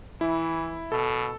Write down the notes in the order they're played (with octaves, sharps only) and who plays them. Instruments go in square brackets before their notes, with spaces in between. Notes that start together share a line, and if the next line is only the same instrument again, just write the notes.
[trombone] E3 [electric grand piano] E4
[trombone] B2 [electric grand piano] A4